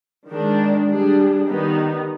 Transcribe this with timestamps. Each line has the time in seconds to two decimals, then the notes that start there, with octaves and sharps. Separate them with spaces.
0.29 D#3 G#3 D4
0.88 G3 D4 G#4
1.47 D#3 G3 B3 D#4